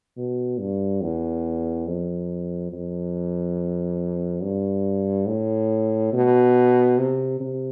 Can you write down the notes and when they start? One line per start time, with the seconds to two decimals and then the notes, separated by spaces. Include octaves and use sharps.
0.17 B2
0.60 G2
1.02 E2
1.87 F2
2.73 F2
4.43 G2
5.27 A2
6.13 B2
6.98 C3
7.40 C3